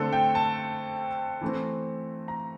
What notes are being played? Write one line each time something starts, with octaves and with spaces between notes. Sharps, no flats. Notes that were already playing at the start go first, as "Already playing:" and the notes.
Already playing: D3 A3 C4 A4
G5
A5
E3 A3 C4
A#5